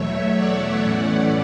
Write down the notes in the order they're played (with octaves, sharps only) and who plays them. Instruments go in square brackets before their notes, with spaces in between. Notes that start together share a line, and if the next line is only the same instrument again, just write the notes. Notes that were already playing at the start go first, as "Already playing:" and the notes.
Already playing: [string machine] E2 B2 F#3 A3 C#5 E5
D5 F#5
A2 E3 A3 C#4